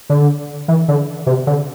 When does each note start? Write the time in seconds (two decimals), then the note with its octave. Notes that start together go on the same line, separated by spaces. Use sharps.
0.10 D3
0.68 E3
0.88 D3
1.27 C3
1.47 D3